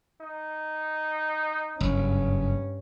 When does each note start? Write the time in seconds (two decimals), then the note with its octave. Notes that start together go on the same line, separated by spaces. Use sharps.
0.21 D#4
1.81 F#1 G2 C#4